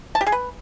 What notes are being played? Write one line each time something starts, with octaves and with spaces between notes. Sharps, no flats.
A5
G4
G#4
B4